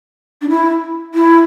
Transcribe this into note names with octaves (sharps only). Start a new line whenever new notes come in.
D4
E4
E4